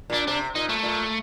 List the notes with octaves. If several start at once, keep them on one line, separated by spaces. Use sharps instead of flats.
A#2 D4
C3 D4
A#2 D#4
A3
A#2